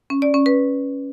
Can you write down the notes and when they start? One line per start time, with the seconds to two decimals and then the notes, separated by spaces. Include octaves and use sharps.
0.10 C#4
0.22 D5
0.34 C#4
0.46 B4